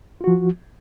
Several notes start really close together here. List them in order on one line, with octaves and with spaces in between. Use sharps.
F4 F#4 F3